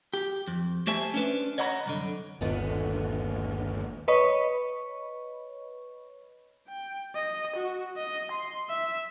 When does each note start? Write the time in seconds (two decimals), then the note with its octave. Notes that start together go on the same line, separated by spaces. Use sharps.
0.14 G4
0.48 F2
0.87 A3 G4 C5 E5 G#5 A5
1.14 C#4 D4 B4
1.58 C#5 D#5 F#5 A#5 B5
1.86 C2 F#2 D3
2.41 G1 D#2 A#2 D3 B3 D#5
4.08 B4 C#5 D#5 B5 C#6
6.68 G5
7.15 D#5
7.56 F#4
7.97 D#5
8.32 C6
8.70 E5